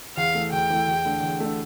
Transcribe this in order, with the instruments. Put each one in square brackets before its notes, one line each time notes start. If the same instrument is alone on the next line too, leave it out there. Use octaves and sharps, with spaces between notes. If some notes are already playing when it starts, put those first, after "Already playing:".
[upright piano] E2 [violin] F5
[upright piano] E3 A3
[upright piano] E2 [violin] G5
[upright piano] E3 A3
E2
D3 A3
E2
D3 A3